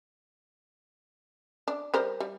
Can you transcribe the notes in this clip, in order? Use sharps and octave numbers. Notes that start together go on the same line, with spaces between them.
D4
G3 A#4 C5
G3